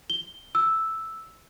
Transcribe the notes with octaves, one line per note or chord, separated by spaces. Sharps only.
G7
E6